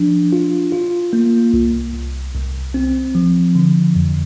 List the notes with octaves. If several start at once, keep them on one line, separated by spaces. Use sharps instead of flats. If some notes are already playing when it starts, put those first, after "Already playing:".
Already playing: F3 D4
F4
F4
A#3
C2
C2
C2
C4
F3
D3
F2